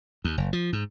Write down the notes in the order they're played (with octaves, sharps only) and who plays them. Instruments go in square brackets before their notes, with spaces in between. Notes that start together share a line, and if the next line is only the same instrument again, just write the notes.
[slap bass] D#2
F#1
F3
G#2